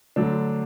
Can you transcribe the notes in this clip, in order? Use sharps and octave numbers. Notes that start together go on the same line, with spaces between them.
D2 D3 F#3 D4